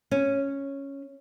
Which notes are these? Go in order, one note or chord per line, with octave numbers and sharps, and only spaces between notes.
C#4